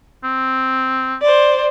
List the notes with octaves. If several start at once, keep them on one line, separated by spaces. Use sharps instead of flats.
C4
C5 D5